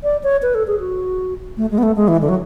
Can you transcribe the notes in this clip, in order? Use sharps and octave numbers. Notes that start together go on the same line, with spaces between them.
D5
C#5
B4
A4
G#4
F#4
A3
G#3
B3
A3
G#3
E3
D3
F#3